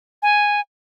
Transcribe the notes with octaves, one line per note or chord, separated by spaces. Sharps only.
G#5